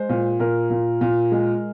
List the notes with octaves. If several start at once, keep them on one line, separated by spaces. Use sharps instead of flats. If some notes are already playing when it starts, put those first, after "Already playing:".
Already playing: G#3 C5
A#2
A#2 A#4
A#2
A#2
G#3